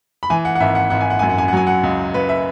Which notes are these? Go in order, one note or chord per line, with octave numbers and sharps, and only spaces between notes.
B5
E3 G#5
F#5
F#5
G#1 E5
F#5
G#1 F#5
G#5
F#5
F#2 G#5
F#5
G#5
F#5
F#3 G#5
F#5
C#2
C#2 B4
E5